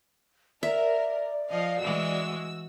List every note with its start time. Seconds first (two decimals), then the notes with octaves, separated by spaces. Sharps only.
0.63 A#4 D5 E5
1.50 F3 D#5 F5
1.82 E3 G#3 F#4 E6